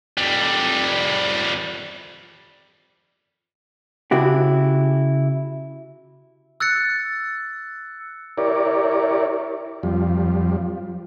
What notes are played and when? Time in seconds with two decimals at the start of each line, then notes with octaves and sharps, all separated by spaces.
0.18 F2 G3
4.11 C#3 E4 F#4 G4
6.60 E6 F#6 A6 C#7
8.38 E4 G4 A#4 C#5 D5
9.83 F2 F3 G3